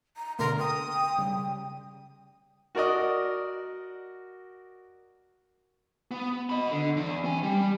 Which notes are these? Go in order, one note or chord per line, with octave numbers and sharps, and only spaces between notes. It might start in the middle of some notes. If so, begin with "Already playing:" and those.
A#5
B2 D3 A3 A#4 C6
G5 D#6
C#3 G3
F#4 A#4 D5 D#5
B3
D#5 B5
D3
E2
C4 G#5
G3